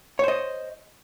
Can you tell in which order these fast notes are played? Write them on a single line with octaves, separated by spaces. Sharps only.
C#5 C5 D#5